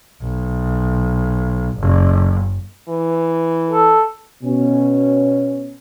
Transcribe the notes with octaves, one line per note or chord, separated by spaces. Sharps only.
B1
F#1
E3
A4
B2 C#4